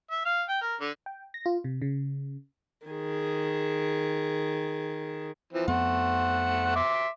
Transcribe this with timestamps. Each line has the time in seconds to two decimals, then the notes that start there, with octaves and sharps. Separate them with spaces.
0.10 E5
0.25 F5
0.49 G5
0.61 A#4
0.80 D3
1.06 G5
1.34 A#6
1.46 F4
1.64 C3
1.82 C#3
2.86 D#3 G#4
5.53 E3 F3 C4
5.68 F2 A3 B3 C5 F#5
6.75 E5 C6 D6